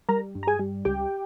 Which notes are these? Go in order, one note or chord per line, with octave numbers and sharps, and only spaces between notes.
G3 A#4 A#5
G2
A#5
G#4 G#5
G3
C#2 G4 G5